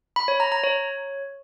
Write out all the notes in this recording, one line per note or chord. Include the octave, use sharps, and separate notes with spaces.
B5
C#5
A#5
A#5
C#5